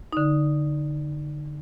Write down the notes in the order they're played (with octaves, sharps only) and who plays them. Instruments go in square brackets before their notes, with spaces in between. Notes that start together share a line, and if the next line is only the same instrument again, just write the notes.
[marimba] D3 D#4